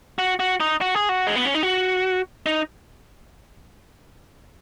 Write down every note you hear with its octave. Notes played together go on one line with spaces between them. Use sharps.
F#4
F#4
D#4
F#4
G#4
F#4
G#3
B3
C#4
D#4
F#4
D#4